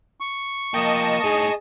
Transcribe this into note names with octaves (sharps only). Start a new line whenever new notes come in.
C#6
F3 A#3 G4 D#5 A5 D#6
A2 D#4 G#4